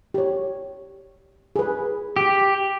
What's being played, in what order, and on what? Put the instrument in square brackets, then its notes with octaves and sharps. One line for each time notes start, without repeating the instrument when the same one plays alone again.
[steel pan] G4 C#5
G#4 B4
[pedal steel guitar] G4